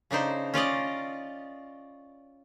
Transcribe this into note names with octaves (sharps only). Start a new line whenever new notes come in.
C#3 D4 D#4 C5
C#4 F4 D5 D#5